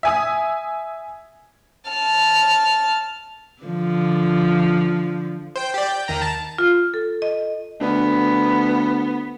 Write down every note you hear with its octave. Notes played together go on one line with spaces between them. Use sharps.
E5 G#5 D#6
A5 F6
D3 F3
C5 G5
G4 D5
G5
D#2 D#3 A#5
A5
F4
A4
D#5
D2 B3